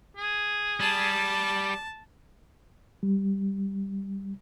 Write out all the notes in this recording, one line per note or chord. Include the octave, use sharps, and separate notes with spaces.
G#4
G3 A5
G3